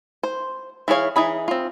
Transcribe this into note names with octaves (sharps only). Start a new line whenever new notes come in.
C5
E3 E4 G#4 C#5 F5
E3 D#4 G#4 B5
C4 F4